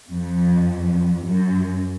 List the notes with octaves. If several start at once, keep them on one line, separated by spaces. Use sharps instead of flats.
F2
F#2